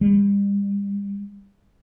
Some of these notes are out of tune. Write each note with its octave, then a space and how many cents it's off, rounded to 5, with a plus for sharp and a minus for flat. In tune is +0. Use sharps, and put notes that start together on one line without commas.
G3 +40